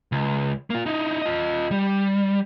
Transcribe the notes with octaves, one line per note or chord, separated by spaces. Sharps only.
C#2
A#3 F4
D#4 E4
F4 D#5
G3